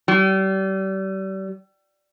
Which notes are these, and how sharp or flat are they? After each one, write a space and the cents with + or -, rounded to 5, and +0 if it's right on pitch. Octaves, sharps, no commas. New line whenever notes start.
G3 -35